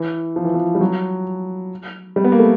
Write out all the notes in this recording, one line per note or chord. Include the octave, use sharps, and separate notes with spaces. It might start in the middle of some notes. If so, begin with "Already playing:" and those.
Already playing: E3
F3
E3
F3
G3
F#3
G3
B3
A#3
A3